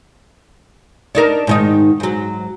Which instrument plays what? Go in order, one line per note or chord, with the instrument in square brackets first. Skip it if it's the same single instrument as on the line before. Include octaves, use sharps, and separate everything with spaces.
[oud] D4 D#4 A#4
G#2 D#3 D#4
G#2 F#3